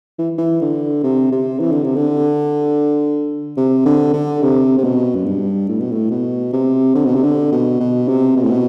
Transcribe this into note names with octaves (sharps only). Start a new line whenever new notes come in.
E3
E3
D3
C3
C3
E3
D3
C3
D3
C3
D3
D3
C3
C3
B2
F#2
G2
A2
B2
A2
B2
C3
D3
B2
C3
D3
B2
B2
C3
B2
A2
B2